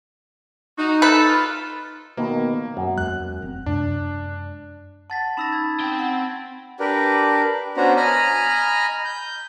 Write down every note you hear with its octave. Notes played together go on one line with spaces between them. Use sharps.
D#4 F#4
A4 B4
F4
B2 D#3 A#3
F#2
E2 G#3 F#6
E1 C4 A#5
F#2 C3 G#3 D4
F#5 A5 A6 B6
C#4 D#4 B5 E6 A#6
G#6
C4 G5
F#5
D4 G4 A#4 B4
B3 C#4 D4 F#4 C5 A#5
D#5 G#5 A#5 B5 F6
G6